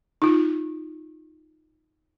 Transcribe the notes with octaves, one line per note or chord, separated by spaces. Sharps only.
D#4 F4